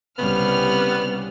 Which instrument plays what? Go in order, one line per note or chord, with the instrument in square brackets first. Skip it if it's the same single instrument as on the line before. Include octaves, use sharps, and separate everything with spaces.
[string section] C2 F6 [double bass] C#3 G3 [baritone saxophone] B3